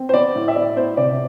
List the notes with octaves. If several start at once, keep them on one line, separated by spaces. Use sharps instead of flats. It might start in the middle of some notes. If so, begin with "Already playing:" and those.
Already playing: C4
C5
B3 D5
A2
E5
E4 D5
B3 C5
C3 D5